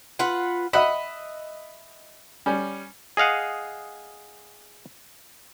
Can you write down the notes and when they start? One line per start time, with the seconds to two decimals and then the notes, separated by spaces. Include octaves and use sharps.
0.19 F4 B4 F#5
0.73 D#5 E5 F#5 B5
2.46 G3 C#4
3.17 G#4 D#5 F5 F#5